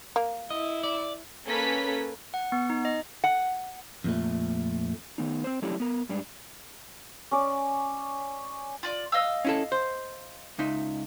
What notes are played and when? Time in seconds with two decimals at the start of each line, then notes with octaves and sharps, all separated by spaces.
0.16 A#3
0.50 E4 D#5
0.83 D5
1.45 A#3 C#4 A4 B4 B6
2.34 F#5
2.52 B3
2.70 D#4
2.85 D#5
3.24 F#5
4.04 F2 A#2 A3
5.18 D#3 B3 D#4
5.44 C4 C5
5.62 F#3 A3 C#4 D4 E4 G4
5.80 B3 A#4
6.09 G#2 G3 D4
7.31 C#4 D5
8.83 F4 D5
9.12 D#5 F5 E6
9.45 C#4 E4 A4
9.72 C5
10.59 C#2 D#4 E5